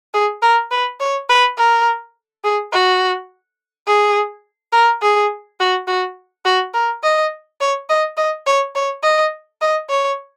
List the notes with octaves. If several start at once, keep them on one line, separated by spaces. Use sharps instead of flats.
G#4
A#4
B4
C#5
B4
A#4
G#4
F#4
G#4
A#4
G#4
F#4
F#4
F#4
A#4
D#5
C#5
D#5
D#5
C#5
C#5
D#5
D#5
C#5